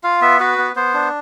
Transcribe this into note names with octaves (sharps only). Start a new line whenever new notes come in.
F4 F5
B3 E5
F#4 B4
B3
B3 C5
D4